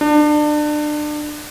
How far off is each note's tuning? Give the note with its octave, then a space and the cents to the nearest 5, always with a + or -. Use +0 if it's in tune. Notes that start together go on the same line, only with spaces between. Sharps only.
D4 +30